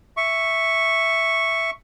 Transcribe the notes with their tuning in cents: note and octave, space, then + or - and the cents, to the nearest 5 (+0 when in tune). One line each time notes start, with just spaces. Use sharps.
E5 +0 C#6 +0